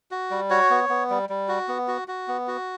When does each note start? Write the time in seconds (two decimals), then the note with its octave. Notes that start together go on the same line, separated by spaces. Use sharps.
0.11 F#4
0.31 G3
0.50 F#4 C#5
0.70 B3
0.89 B3
1.10 G3
1.29 G3
1.48 F#4
1.68 B3
1.88 F#4
2.08 F#4
2.28 B3
2.48 F#4